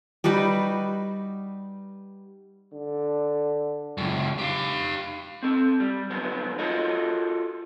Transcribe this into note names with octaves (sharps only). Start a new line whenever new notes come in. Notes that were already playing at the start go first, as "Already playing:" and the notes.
G3 D#4 F#4 B4
D3
C#2 F#2
G4 F5
C4 A4
G3
D3 F3 F#3 B3
F4 F#4 A4 C#5 D#5